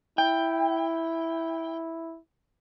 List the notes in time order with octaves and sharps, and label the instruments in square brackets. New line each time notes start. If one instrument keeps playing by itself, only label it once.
[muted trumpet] E4 [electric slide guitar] G5